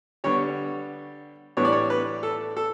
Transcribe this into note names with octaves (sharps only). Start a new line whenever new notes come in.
D3 G3 B3 C#5
A2 E3 G3 B3 D4 C#5
D5
C#5
B4
A4
A4